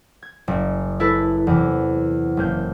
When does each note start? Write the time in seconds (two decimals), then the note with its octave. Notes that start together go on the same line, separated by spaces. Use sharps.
0.23 G#6
0.48 F#1
1.00 E4 A4 B4
1.47 E2 C3
2.37 F#1 A#3 G6